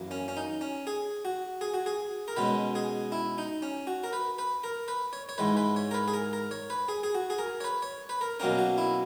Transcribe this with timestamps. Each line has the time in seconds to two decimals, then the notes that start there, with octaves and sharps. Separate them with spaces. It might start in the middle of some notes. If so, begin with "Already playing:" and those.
Already playing: F#2 E3 A#3
0.11 C#4
0.28 C#4
0.37 D#4
0.61 C#4
0.87 G#4
1.25 F#4
1.61 G#4
1.74 F#4
1.86 G#4
2.28 A#4
2.36 B2 G#3 C#4 B4
2.75 G#4
3.12 E4
3.38 D#4
3.62 C#4
3.87 F#4
4.04 A#4
4.13 B4
4.38 B4
4.64 A#4
4.88 B4
5.13 C#5
5.29 C#5
5.38 G#2 E3 G#3 B4
5.57 B4
5.76 C#5
5.91 A#4
5.94 B4
6.08 G#4
6.13 A#4
6.33 A#4
6.51 C#5
6.70 B4
6.88 G#4
7.03 G#4
7.15 F#4
7.30 G#4
7.38 A#4
7.61 C#5
7.64 B4
7.82 C#5
8.09 B4
8.21 A#4
8.40 B2 F#3 A#3 C#4 A#4
8.59 F#4
8.78 E4